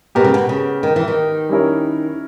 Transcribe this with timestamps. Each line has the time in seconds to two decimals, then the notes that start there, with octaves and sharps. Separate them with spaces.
0.15 B2 B3 G4 A#4
0.24 C#3
0.34 B2
0.49 C#3
0.83 D#3
0.96 E3
1.08 D#3
1.49 G3 C#4 E4 A#4